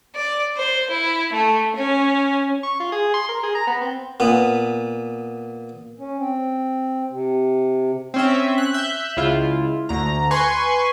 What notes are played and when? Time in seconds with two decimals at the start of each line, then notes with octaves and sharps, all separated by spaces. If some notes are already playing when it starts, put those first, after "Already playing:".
0.15 D5
0.56 C5
0.90 E4
1.33 A3
1.75 C#4
2.63 C#6
2.80 F4
2.92 G#4
3.14 C6
3.29 A#4
3.43 G#4
3.55 A#5
3.67 B3
3.81 C4
4.20 A#2 B3
5.99 C#4
6.17 C4
7.10 C3
8.14 C4 C#4 E5
8.58 F#6
8.73 E5 F#6 G6
9.17 C#2 E4 F4
9.89 D2 A#5
10.31 B4 G#5 C6 C#6